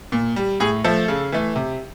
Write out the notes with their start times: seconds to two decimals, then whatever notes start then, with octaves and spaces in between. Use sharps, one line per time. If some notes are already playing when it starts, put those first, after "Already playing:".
0.12 A#2
0.36 G3
0.60 A2 G#4
0.84 F3 A3 A4
1.08 C#3
1.32 E3 A3
1.56 C3